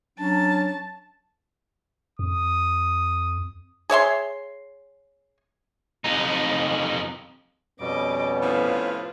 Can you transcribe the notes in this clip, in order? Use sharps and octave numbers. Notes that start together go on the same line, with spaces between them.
F#3 C#4 D4 A5
F2 D#6
G#4 C#5 E5 C6
F2 D#4
F2 B2 G3 B3 C#4 D#5 D6
A2 C3 F3 F4 B4